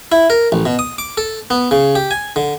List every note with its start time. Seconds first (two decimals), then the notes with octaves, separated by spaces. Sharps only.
0.12 E4
0.30 A#4
0.52 A1
0.66 B2
0.79 D#6
0.98 D6
1.17 A4
1.50 B3
1.71 C#3
1.95 G4
2.11 G#5
2.36 D3